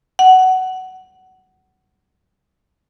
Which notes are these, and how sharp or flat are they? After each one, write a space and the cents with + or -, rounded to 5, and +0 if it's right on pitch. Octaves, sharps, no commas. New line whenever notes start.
F#5 +15